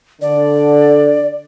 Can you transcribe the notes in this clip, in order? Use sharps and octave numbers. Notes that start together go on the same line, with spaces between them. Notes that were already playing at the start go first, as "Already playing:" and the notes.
D3 D5